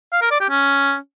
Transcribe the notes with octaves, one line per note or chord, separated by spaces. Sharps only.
F5
A#4
D5
G4
C#4